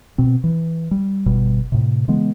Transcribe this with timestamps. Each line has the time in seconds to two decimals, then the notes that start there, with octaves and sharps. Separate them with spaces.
0.18 B2 C4
0.44 E3
0.91 G3
1.26 G1 B2 G3
1.72 A2 C3
2.08 C#3 E3 G#3 B3